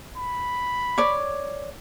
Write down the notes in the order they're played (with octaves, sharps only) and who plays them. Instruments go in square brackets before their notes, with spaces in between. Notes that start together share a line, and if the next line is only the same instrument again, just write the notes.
[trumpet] B5
[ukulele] C#5 D5